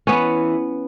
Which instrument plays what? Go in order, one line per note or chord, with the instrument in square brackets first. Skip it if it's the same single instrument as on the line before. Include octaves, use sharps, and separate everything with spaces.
[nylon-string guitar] E3 [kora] B3 C#4